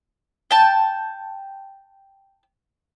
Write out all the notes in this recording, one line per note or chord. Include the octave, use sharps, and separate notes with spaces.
G5 A5